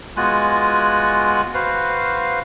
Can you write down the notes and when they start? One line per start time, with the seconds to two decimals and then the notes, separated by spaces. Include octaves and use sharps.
0.17 G#3 B3 F4 F#4 G#5 F#6
1.54 F#4 B4 C5 F5